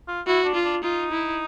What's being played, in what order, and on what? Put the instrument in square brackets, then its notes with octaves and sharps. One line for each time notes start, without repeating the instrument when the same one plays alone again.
[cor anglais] F4
[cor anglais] E4 [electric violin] F#4
[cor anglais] D4
[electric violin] F4
[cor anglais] D4
[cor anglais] D#4 [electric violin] F4
[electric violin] E4